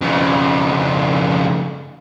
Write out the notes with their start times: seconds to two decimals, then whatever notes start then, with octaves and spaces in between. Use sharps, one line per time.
0.01 F2 C#3